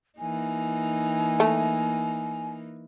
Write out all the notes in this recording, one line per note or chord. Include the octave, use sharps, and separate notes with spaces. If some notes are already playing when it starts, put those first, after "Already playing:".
E3 A#3 D#4 G#5
A3